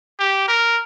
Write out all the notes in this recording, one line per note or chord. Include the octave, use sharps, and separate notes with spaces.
G4
A#4